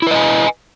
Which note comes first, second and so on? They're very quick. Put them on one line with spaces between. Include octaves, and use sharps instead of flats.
E4 B4 D#5 G#5